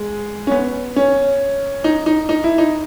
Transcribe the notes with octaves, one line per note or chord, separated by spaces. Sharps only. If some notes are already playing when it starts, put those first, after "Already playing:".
Already playing: G#3
C#4
B3
C#4
D#4
D#4
D#4
E4
D#4